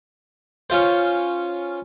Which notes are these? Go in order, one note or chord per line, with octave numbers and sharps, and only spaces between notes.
C#4 F4 C5